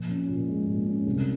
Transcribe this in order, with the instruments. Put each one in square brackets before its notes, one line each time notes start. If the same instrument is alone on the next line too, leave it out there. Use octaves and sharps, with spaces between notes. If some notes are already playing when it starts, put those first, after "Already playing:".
Already playing: [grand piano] A#2 F3
C#4
A#2
G#3
A#2
C#4
C2